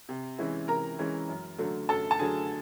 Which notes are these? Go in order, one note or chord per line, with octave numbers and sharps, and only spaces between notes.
C3
E3 G#3 C#4 E4
C3 A#4 A#5
E3 G#3 C#4 E4
F#2
D3 F#3 A3
F#2 A4 A5
A5
D3 F#3 A3 G#4 G#5